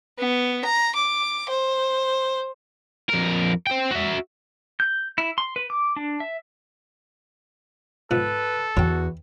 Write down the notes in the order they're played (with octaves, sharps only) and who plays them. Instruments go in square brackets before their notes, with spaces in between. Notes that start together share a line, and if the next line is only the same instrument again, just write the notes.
[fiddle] B3
A#5
D6
C5
[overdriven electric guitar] F2 A#4
C5 G5
F#4 E5
[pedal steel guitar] G6
E4
C6
B4
D6
D4
E5
[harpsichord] G#2 F3 B3 [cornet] A4 [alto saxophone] B4
[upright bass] E2 [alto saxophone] F#4 [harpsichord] C#5 G5